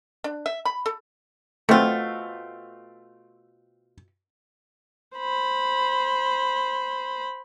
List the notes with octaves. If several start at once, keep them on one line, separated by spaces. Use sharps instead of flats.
D4
E5
B5
A4
B2 A3 C4 F4
C5 B5